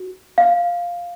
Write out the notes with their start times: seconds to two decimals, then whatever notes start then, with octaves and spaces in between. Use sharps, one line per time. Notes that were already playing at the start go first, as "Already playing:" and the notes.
Already playing: F#4
0.38 F5